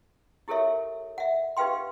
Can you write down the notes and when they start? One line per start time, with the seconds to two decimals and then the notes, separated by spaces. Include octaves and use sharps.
0.48 E4 G4 A4 A#4 C#5 E5
1.18 E5 F#5
1.57 D#4 G4 B4 F5 G5 C6